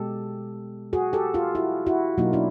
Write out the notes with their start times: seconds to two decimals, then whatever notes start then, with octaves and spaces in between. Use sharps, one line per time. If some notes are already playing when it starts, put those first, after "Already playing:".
Already playing: B2 G#3 G4 A4
0.93 F#4 G#4
1.13 G4 A4
1.34 F4 G4
1.55 E4 F#4
1.87 E4 F#4
2.18 B2 F#3 A#3 D#4 F4
2.33 D4 E4